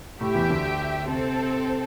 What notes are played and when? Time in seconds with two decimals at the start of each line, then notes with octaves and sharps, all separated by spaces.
0.20 A2 A3 G4 E5 G5
0.35 E2 E3
0.49 D2 D3
1.08 C3 C4 A4 C5